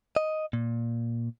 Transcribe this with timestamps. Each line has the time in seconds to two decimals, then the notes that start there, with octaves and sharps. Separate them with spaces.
0.16 D#5
0.53 A#2